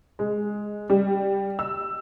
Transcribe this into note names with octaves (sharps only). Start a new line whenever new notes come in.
G#3
G3
E6